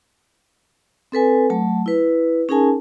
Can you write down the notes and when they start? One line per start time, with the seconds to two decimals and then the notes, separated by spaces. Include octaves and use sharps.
1.12 C4 A4 B4 G#5
1.50 F#3 A3 A5
1.86 E4 B4
2.49 C#4 D#4 G#4 A#4 G#5 A5